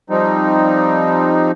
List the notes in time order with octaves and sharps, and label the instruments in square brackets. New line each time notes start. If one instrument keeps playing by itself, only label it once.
[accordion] F3 G3 C4 D#4